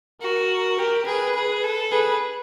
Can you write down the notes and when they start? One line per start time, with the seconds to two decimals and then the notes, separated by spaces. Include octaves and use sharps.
0.22 F#4 A#4
0.78 G4 A#4
1.06 G#4 B4
1.35 G#4
1.63 A4
1.91 G#4 B4